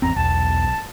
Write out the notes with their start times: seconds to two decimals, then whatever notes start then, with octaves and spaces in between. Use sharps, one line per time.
0.02 G#1 E2 C4 A#5
0.16 B1 E2 A5